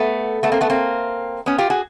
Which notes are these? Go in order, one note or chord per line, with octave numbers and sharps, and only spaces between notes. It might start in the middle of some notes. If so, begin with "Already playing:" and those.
Already playing: A3 B3
A3 B3
A#3 C4
A3 B3
A#3 C4
B3 C#4
F4 G4
F#4 G#4